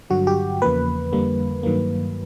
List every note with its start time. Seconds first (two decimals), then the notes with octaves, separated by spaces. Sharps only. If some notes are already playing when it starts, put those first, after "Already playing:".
0.10 G2 D3 F#3 F#4
0.27 G4
0.62 E2 C#3 F3 A#3 B4
1.12 F2 D3 G3 A#3
1.63 G2 D#3 F#3 A#3